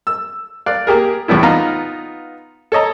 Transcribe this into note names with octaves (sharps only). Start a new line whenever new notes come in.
E6
D5 F5 F#6
A#3 G4 G#4 A#4
E2 A2 G3 B3 E4
B3 D#4 F4 F5 A#5 F6
A4 C#5 D#5 A#5